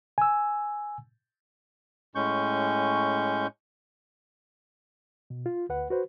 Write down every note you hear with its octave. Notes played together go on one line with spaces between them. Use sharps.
G#5 E6
A2 G#3 C#4 C#6 G6
B2
F4
D2 B4 F#5
F#4 B4 C5